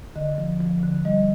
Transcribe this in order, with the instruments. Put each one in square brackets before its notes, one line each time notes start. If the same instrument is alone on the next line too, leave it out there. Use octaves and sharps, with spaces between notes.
[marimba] D3 D#5
F3
F3
D3
G3 D#5